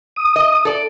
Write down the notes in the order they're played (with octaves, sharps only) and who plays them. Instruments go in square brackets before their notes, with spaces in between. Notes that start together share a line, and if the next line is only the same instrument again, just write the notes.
[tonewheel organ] D#6
[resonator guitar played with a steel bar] D#5
A4 D5